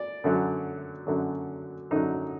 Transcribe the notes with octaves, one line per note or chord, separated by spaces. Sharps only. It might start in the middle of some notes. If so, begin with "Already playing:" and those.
Already playing: D5
F#2 D3 F#3
F#2 D3 F#3
F#2 D3 F#3 D#4